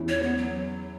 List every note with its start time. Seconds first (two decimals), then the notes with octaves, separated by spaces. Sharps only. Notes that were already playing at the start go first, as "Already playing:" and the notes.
Already playing: E2 E3 C#4 E4
0.09 C#5
0.23 B3
0.37 F#3